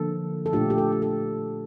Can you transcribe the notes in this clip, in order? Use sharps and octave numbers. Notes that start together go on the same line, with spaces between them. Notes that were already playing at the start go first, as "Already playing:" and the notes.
Already playing: D3 F3 A#3 A4
A4
A#2 A3 D4 F4 G4
G4
A4
G4
A4